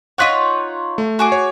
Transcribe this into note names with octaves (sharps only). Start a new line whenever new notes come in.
D#4 F4 C#5 F#5 F#6 B6
A3
F#4 G#4 D6
C#5